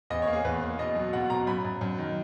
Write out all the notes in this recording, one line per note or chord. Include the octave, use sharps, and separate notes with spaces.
E2 D#5
C#5
A#3
G#4
E2 B4
A#3
B2 D#5
F#3
B2 F#5
B2 A#5
F#2 B5
F#2
F#2
D#3